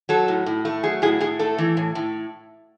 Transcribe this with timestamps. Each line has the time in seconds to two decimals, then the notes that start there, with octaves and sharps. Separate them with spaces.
0.09 F#3 A4
0.28 A2
0.46 A2
0.65 A3
0.83 F#3 G#4
1.02 A2 G#4
1.20 A2 G#4
1.39 A3 A4
1.58 E3
1.77 A2
1.95 A2